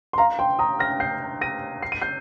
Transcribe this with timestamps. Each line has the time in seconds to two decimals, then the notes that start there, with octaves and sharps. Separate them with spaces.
0.13 C6
0.18 F5 A#5
0.39 G5 C6
0.59 A#5 D#6
0.79 F6 A#6
1.00 G6 C7
1.41 A#6 D#7
1.82 C7
1.92 D#7
2.02 G6 C7